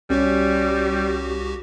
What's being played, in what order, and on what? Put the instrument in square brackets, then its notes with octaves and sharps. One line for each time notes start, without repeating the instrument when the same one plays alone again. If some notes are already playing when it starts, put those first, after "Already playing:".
[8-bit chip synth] C2 F#4 G4 [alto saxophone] G3 [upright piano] C#4